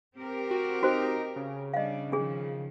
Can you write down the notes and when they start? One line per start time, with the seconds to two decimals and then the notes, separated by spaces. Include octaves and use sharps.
0.17 C4 G4 A#4
0.51 F#4
0.83 D#4 F#4 C5
1.36 C#3
1.74 G3 D4 D#5 F5
2.12 D#3 F3 D4 G#4